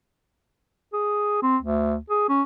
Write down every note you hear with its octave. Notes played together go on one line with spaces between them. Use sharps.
G#4
C4
D2
G#4
C#4